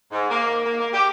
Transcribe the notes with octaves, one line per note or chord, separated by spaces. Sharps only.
G#2
A#3
A#3
A#3
G4